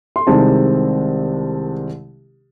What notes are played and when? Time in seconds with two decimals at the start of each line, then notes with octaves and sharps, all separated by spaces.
0.16 C6
0.27 C2 C3 D#3 G#3 C4 A5